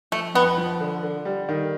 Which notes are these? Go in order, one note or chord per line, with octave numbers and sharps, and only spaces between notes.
F3 A3
F2 B3
F3
D3
D3
G3
D#3